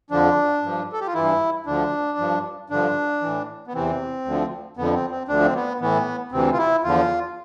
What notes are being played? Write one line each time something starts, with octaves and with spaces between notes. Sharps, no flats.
F2 D3 F3 D4
G2 F3
A4
G4
F4
G2 E3 E4
D2 D3 F3 D4
G2 F3
G2 D3 F3 D4
A2 E3
B3
E2 C3 E3 C4
D2 D3 F3
F2 D3 F3 B3
C4
C4
D2 D3 F3 D4
C4
B3
A2 E3 B3
D2 C3 E3 C4
F4
E4
E2 D3 F3 F4